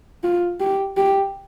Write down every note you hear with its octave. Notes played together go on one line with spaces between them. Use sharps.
F4
G4
G4